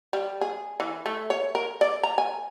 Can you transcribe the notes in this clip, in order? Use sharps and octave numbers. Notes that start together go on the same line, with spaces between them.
G3
G#4
E3
A3
C#5
A#4
D5
A#5
G#5